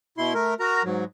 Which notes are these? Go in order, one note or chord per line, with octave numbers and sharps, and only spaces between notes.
B2 E4 C6
A3 A#4
F#4 A#4 A#5
G#2 F#3